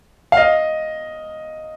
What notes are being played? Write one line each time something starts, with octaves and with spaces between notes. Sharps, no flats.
F5
D#5